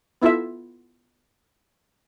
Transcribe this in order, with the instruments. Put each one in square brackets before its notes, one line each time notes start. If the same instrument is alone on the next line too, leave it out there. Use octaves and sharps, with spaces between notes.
[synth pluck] B3 E4 F4 A4 E5